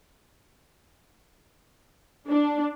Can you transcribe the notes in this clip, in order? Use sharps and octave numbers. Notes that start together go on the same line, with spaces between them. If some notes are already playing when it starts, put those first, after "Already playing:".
D4